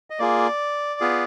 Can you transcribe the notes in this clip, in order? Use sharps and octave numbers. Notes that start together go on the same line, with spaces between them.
D#5
A#3 F4 G#4 D5
B3 F4 G#4